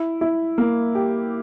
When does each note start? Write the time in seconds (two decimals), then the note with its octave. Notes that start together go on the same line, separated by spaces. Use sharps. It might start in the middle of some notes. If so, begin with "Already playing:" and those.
Already playing: E4
0.21 E4
0.58 A#3
0.95 G4